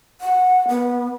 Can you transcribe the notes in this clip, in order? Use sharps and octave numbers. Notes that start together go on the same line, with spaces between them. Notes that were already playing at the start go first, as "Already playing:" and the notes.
F#5
B3